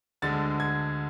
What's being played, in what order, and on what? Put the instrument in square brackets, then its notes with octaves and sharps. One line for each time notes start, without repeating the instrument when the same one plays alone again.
[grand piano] D2 D3 G#3 A6
G#6